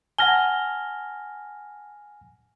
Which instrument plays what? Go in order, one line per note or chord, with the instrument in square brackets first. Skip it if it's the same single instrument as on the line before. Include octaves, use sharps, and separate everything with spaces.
[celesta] F#5 A5 G7 [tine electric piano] G#5 F6 A#6